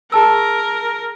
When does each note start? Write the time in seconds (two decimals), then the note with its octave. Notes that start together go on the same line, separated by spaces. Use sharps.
0.12 G#4 A#4 A5 E6